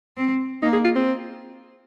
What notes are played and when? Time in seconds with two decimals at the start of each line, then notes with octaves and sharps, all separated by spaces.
0.17 C4
0.62 A#3 D#4
0.73 G#4
0.85 F4
0.96 C4